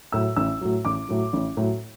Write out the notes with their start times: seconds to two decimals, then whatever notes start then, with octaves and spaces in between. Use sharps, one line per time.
0.12 A2 F#3 E6
0.36 A1 E6
0.61 A2 F#3
0.85 A1 D6
1.09 A2 F#3
1.33 A1
1.57 A2 F#3